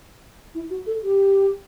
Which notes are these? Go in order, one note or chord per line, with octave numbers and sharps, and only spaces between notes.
E4
F#4
A4
G4